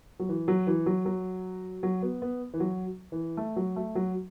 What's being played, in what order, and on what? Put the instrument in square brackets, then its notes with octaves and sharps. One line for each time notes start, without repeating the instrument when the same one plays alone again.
[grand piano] F#3
E3
F#3
E3
F#3
F#3
F#3
B3
B3
E3
F#3
E3
A3
F#3
A3
F#3